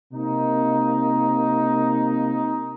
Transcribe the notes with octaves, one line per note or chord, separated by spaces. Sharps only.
C3 A#3 D#4